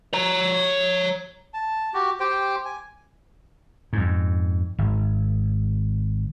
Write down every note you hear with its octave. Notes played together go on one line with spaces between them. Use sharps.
C#5 A#5
A5
F#4 G4
G4 C5 G5
G#5
F2 G#2
G#1